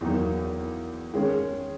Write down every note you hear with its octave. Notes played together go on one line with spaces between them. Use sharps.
E2 D#3 F#3 A#3 D#4
D#3 G#3 C#4 G#4